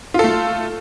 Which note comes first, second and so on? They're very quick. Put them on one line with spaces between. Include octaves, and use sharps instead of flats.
F4 A4 A3